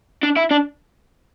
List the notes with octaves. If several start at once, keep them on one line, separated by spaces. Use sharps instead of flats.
D4
E4
D4